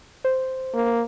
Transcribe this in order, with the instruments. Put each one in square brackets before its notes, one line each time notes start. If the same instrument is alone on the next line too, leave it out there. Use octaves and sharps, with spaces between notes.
[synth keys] C5
[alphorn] A#3